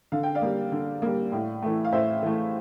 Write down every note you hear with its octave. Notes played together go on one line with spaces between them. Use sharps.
D3 F5
G5
D5 F5
G3 A#3
D3
G3 A#3
A2
E3 A3
F5
A2 C5 E5
E3 A3